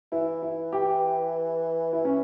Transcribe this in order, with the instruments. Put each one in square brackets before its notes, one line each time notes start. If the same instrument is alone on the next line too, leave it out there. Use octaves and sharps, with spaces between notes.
[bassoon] E3 [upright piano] E4
[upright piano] E4
G4
[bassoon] E3 [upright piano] E4
[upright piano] C#4